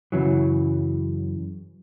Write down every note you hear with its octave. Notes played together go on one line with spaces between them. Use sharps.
F#2 C#3 E3 F#3